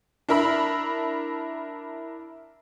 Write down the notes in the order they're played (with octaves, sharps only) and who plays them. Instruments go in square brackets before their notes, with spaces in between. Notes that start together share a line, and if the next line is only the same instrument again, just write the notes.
[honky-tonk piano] D4 E4 A#4 E5 B5